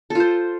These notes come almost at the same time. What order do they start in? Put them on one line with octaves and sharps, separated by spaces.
A4 F4 C5